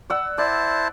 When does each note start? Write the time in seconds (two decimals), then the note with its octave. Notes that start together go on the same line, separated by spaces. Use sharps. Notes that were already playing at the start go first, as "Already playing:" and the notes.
0.10 D5 F#5 E6
0.38 E4 C5 D5 A5